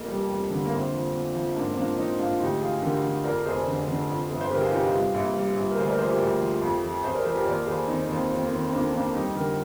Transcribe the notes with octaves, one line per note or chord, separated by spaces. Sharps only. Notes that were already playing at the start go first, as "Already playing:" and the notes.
Already playing: F1 F2 A#3
G3
F2
D3
A#3
A#1 C4
F3
A#2
F3
G#2 A#3 D4
C4
F3 A#3 D4
F3 C4 D#4
G#2 D4 F4
D2 D#4 G4
F3 F4 G#4
D3 G4 A#4
D3
F2 A#4 D5
F1 G#4 C5
D3
D3
F2
G1
C5
G1 G4 A#4
F4 G#4
C3 D#4 G4
F4 G#4
G3
A#1
G3
A#1
A#4
D2 G#4 C5
A#4 D5
F3 G#4 C5
G4 A#4
D2
F3
F2
F3
F2 G#4 C5
A#4 D5
F3 G#4 C5
G4 A#4
D#2 A#4 D5
D#2 G#4 C5
D#3 C4 D#4
C4
D#2 C4
F2 C4
A#3
D#3 C4
C4
F2 A#3 D4
F2 A#3 D4
G3 D#4 G4
D3 G4 A#4